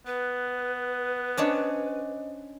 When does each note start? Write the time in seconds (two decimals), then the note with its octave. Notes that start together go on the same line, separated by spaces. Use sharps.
0.07 B3 B4
1.37 C#4 D4 C5 C#5 D#5